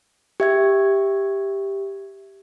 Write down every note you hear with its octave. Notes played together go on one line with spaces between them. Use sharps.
G4 E5 G#6